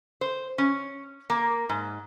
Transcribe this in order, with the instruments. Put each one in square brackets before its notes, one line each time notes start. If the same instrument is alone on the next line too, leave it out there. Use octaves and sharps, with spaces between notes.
[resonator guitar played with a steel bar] C5
C#4
A#3
G#2